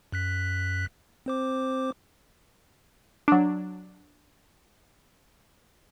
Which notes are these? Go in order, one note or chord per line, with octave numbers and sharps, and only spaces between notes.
F#2 F#6 B6
C4 C5 D6
F#3 D4